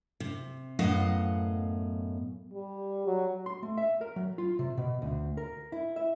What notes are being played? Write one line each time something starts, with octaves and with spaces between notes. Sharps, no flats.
C3
F#2 A2 B3 D#5 F5 F#5
G3
F#3
C6
A3
E5
A#4
F#3
F4
C3
B2
D2
A#4
E4
E5